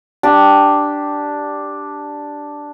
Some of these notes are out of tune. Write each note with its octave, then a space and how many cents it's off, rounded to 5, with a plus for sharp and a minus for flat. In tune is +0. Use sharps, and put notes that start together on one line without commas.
D4 +0 G4 +0